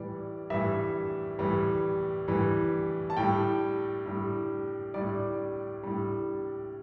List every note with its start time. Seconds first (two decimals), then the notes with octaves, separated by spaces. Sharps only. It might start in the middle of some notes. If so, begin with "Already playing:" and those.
Already playing: A2 E3 G3 D5
0.50 A2 E3 G3 E5
1.39 A2 E3 G3
2.28 A2 E3 G3
3.10 A5
3.17 A2 G3 G5
4.06 A2 G3
4.94 A2 G3 D5
5.83 A2 G3